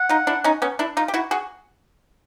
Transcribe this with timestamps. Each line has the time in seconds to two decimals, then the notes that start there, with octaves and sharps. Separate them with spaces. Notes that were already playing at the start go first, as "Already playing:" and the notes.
Already playing: F#5
0.09 D#4 F4
0.27 D4 E4
0.44 C#4 D#4
0.62 B3 C#4
0.79 D4 E4
0.97 D#4 F4
1.08 G4
1.14 E4 F#4
1.31 F#4 G#4